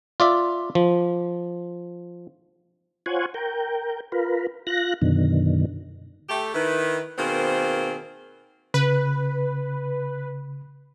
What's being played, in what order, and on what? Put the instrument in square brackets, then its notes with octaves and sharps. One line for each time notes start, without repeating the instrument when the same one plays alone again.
[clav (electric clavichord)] F4 D5 E5
F3
[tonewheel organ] F4 C5 C#5 F#5 G#5
A#4 G5
F4 A#4 B4
F4 F#6 A#6
F#2 B2 D3 D#3
[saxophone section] A3 G4
D#3 E4 B4
B2 D#3 A#3 C4 G#4 C5
[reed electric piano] C#3 [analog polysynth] B4